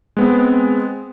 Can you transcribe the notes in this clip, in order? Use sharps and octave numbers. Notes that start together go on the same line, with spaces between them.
G#3 B3 C4